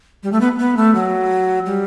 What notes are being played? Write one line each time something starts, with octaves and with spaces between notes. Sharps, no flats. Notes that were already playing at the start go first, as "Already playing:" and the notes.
G3
A3
B3
B3
A3
F#3
G3